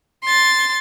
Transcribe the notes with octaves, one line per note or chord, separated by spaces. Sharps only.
C6 A6